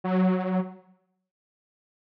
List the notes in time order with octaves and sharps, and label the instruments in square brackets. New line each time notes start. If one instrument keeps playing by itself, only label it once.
[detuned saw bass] F#3